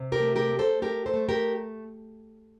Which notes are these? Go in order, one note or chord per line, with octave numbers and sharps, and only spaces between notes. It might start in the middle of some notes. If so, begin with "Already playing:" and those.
Already playing: C3
G4 A#4
A3
G4 A#4
A3
A4 C5
A3 G4 A#4
A4 C5
A3
G4 A#4